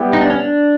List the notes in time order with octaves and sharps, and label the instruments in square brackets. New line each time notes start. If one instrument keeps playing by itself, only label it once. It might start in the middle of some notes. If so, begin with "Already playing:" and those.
Already playing: [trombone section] G3 B3 E4 G4
[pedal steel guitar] D#4
D4
C#4
D4